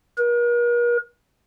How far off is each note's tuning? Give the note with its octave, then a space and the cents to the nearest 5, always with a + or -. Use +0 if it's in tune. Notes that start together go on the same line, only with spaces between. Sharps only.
A#4 +45